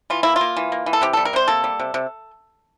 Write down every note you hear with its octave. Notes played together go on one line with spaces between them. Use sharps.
E3 F4
A#3 E4
F4
A#3
E3
A#3
E3
A4
C3 G4
G3 A4
A#4
C3 C5
A#3 A4
G3
C3
C3